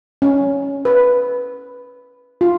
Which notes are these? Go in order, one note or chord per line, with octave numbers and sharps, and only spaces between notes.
C#4
B4
F4